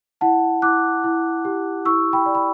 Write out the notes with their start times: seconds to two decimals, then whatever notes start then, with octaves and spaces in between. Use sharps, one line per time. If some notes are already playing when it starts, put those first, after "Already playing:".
0.21 E4 F#5 A5
0.62 E4 D6 F#6
1.04 E4
1.45 G4
1.85 E4 C#6 E6
2.13 G5 B5
2.26 D5
2.35 B5